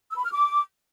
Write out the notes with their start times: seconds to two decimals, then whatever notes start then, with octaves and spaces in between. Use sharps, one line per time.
0.10 E6
0.17 B5
0.24 F6
0.31 D6